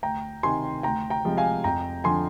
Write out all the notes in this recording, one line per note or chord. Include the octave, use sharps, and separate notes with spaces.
D2 G5 A#5
C3 D#3 G#5 C6
D2 G5 A#5
G5 A#5
C3 F3 G#3
F5 G#5
F2 G5 A#5
D3 F3 G#5 C6